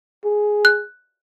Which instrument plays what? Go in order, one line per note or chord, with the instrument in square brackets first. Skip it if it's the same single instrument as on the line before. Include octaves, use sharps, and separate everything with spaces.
[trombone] G#4
[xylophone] F#6